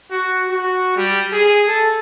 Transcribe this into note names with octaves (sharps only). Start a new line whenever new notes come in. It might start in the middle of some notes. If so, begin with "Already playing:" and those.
F#4
F#4
G3
G#4
A4